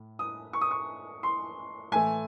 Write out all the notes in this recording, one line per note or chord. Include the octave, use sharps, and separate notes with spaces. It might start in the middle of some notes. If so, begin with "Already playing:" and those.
Already playing: A2
D#6
C#6
D#6
C#6
C6
A2 E3 A3 G#5